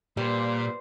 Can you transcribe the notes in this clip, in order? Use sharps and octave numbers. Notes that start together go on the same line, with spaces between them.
A#2 G3 B4 C5